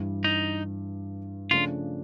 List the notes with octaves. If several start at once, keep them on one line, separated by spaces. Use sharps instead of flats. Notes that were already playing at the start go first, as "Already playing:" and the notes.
Already playing: G2 E3 G3
D#4
C#3 F3 A3 D4 F4